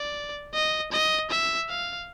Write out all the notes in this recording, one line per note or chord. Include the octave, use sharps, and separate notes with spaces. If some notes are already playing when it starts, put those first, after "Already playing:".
Already playing: D5
D#5
D#5
E5
F5